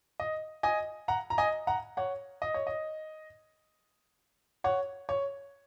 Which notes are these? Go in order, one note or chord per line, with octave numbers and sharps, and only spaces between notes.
D#5
D#5 G#5
F#5 A#5
A#5
D#5 G#5
F#5 A#5
C#5 F#5
D#5
C#5
D#5
C#5 F#5
C#5